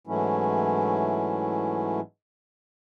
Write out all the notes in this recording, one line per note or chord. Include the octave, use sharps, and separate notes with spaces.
G#2 E3 F#3 A3 C#4 E4